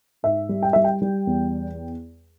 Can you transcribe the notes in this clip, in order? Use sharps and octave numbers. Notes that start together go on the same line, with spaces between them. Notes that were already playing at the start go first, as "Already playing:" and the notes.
G#2 E5
G3
G5
G3 E5
G5
G3
E2